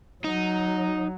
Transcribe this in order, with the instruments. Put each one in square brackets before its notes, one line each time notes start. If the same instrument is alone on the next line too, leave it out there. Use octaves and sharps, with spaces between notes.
[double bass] F#3 [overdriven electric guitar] D#4